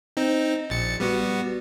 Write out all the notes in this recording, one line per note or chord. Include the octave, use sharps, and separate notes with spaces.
C4 D#4
A#1 A6 C#7
G3 B3 F#4